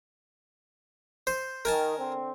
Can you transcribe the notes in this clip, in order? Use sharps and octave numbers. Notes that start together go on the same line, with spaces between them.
C5
D#3 A#4 G#5 A5
D3 C4